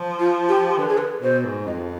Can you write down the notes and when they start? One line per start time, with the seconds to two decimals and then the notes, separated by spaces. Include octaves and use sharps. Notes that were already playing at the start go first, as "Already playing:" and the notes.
Already playing: F3
0.19 F4
0.49 G4
0.78 D3 B4
0.88 G#4
0.98 B4
1.22 B2 C5
1.45 G#2
1.67 F2 D#5